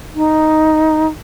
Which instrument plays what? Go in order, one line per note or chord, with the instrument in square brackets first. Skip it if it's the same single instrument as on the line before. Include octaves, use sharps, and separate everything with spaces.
[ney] D#4